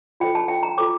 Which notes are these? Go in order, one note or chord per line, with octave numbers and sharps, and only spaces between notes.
F4 A4 C5 G5
A5
G5
A#5
F4 A4 C5 D6